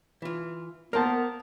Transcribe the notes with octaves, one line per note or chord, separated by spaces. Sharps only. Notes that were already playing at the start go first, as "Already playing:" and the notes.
E3 F4
A#3 B3 A#4 C5 A5